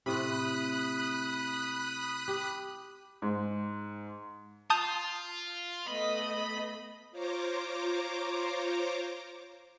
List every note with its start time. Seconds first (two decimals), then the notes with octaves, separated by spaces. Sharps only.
0.06 A2 C3 B5 D#6 F#6
2.28 G4
3.22 G#2
4.70 F4 A5 D#6 G6
5.88 A3 B3 D#5 B5
7.11 F4 C5 C#5 A#5 D6